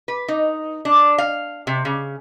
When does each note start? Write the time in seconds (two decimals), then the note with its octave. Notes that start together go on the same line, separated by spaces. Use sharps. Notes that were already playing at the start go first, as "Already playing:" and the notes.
0.08 B4
0.28 D#4
0.85 D4
1.18 F5
1.67 C3
1.85 C#3